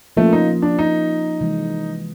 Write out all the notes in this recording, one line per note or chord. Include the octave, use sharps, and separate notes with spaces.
F3 A3 A#3 C#4 F4
D#4
D4
D#4
C3 E3 G#3